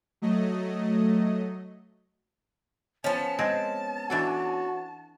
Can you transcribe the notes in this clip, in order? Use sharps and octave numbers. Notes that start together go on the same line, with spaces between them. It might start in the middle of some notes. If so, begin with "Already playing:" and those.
F#3 A3 D#5
F3 B3 C#4 A5
G#3 C4
E3 D4 F#4 A4